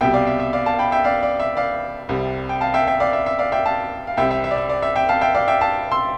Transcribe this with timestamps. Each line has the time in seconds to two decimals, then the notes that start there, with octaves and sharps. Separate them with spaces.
0.01 C2 B2 G3 E5 G5
0.14 D5 F5
0.27 E5
0.40 E5
0.53 D5 F5
0.66 F5 A5
0.79 G5 B5
0.92 E5 G5
1.04 D5 F5
1.23 D5
1.40 E5
1.57 D5 F5
2.09 C2 C3 G3
2.49 G5
2.61 F5 A5
2.74 E5 G5
2.87 E5 G5
3.00 D5 F5
3.13 E5
3.26 E5
3.39 D5 F5
3.52 E5 G5
3.66 F5 A5
4.07 F5
4.17 C2 C3 G3 E5 G5
4.31 E5
4.44 E5
4.51 D5
4.56 E5
4.69 D5
4.82 E5
4.96 E5 G5
5.09 F5 A5
5.21 E5 G5
5.35 D5 F5
5.48 E5 G5
5.61 F5 A5
5.92 C6 E6